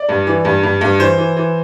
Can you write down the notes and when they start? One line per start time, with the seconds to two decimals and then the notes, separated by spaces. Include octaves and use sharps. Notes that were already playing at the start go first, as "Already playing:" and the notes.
Already playing: D5
0.09 G2
0.27 E3
0.45 G2
0.63 G2
0.81 G2
0.99 E3 C5
1.18 E3
1.37 E3